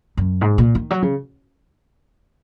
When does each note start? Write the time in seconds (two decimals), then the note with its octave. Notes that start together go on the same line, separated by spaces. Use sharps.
0.17 F#2
0.41 G#2
0.58 A#2
0.75 D#3
0.91 F#3
1.02 C#3